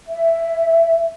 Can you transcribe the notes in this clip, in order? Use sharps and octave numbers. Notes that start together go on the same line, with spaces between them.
E5